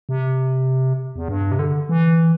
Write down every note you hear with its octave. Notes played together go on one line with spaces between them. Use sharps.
C3
E2
G2
C3
D3
E3